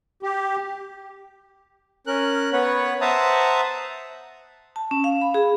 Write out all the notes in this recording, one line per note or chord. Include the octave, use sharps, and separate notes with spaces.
G4
C#4 A#4 F#6
B3 B4 C#5 F#5
C5 E5 F#5 A5 A#5 D#6
A5
C#4
F5
B5
G#4